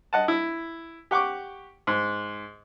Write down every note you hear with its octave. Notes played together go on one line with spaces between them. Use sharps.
D#5 F#5 A5
E4
G4 F#5 C#6 D6
G#2